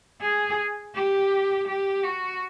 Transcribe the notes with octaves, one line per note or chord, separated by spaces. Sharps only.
G#4
G4
G4
F#4